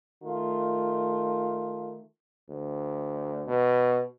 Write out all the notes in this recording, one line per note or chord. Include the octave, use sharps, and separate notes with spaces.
D#3 A3 F4
D2
B2